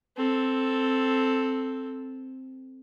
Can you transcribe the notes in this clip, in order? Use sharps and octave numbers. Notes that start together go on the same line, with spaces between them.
C4 A4